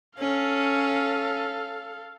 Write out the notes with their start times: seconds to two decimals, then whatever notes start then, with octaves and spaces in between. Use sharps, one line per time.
0.19 C#4 A4 F5